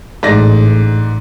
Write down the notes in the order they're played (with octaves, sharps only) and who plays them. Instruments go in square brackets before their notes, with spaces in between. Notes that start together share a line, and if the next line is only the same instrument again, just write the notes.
[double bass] A1 [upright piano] G#2 D5 A#6